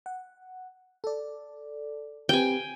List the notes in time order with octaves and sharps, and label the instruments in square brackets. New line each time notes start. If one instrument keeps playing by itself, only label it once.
[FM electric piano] F#5
A4 D5
[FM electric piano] C4 G4 B4 [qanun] G5 G#5